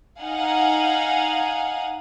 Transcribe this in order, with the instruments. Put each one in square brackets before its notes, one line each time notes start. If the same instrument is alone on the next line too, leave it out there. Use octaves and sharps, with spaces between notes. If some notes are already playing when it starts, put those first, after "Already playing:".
[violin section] D#4 F5 F#5 G#5